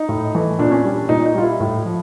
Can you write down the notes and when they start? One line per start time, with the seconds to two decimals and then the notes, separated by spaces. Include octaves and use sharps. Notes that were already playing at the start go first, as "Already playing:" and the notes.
Already playing: D#4
0.09 A2
0.35 E3 A3
0.59 A#2 D4
0.71 C#4
0.84 G3 D4
1.09 A#2 D#4
1.26 D#4
1.34 G3 F4
1.43 E4
1.60 A2
1.85 F3